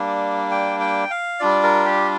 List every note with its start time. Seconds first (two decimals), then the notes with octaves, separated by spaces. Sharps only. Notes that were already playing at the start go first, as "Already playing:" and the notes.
Already playing: G3 A#3 D4
0.51 G5
0.80 G5
1.10 F5
1.40 G3 D4 F4 D5
1.63 A#4
1.85 G4